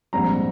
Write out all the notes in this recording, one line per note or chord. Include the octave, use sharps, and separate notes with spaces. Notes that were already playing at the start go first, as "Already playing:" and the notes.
A#1 G#2 G3 C4 A#5